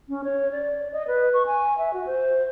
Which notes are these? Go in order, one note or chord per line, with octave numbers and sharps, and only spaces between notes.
C#4
C#5
D5
D#5
B4
C#6
G#5
E5
F#4
C5